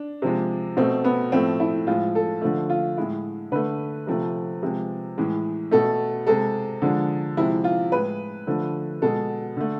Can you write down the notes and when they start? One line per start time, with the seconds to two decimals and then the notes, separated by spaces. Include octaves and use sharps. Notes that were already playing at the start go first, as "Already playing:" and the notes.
Already playing: D4
0.22 C3 F3 G#3
0.77 B2 A3 C4
1.04 B3
1.32 A2 F3 A3 C4
1.60 E4
1.87 A2 F3 G#3 F4
2.15 A4
2.42 D3 F3 A3
2.70 F4
2.97 A2 G#3 E4
3.52 D3 A3 B4
4.07 C3 F3 A3
4.63 C3 F3 G#3
5.18 A2 E3 G#3
5.71 B2 A3 A4
6.27 C3 G#3 A4
6.82 D3 F3 G#3
7.37 C3 F3 G#3 E4
7.64 F4
7.92 A2 G#3 B4
8.47 D3 F3 A3
9.02 B2 G#3 A4
9.56 D3 A3